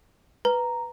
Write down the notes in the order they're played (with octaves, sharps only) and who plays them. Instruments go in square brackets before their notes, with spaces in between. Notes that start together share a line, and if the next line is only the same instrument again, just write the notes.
[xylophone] B4 [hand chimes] A#5